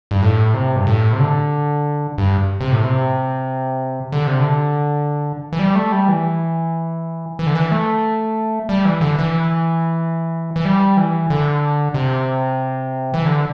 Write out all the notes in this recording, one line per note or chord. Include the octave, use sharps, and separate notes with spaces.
G2
A2
C3
G2
A2
C3
D3
G2
C3
A2
C3
D3
C3
D3
E3
G3
A3
G3
E3
E3
D3
E3
A3
G3
E3
D3
E3
E3
G3
E3
D3
C3
E3
D3